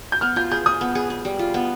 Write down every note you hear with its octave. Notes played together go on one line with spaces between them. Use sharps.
G6
B3 F6
F4 G6
G#4 G6
G#4 D#6
B3
G#4
G#4
G3
F4
B3